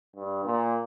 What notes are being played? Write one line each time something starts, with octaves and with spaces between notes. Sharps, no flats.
G2
A#2